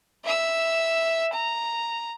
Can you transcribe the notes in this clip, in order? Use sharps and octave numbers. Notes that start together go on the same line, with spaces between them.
E5 E6
A#5